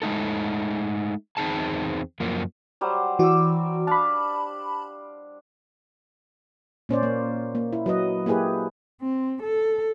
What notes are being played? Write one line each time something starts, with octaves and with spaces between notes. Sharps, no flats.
G#3 A3 D#4 A4
E2 C4 D#4 G#4 A5
F#2 F3 A#3
F#3 G3 C5
E3 F#4 D5 E6
D4 F5 A5 B5
A#2 C#4 C5 D5
A#3
A#3
E4
F#3 B4 D#5
A#3 E4 G4 G#4 B4
C4
A4